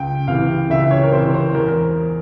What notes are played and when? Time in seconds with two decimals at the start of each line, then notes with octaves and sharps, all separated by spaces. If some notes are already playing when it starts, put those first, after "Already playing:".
Already playing: C#2 G5
0.28 C3 E3 F5
0.70 C#2 E5
0.91 C#5
1.04 A#4
1.12 C3 E3 C5
1.34 C5
1.55 E2 A#4
1.68 A#4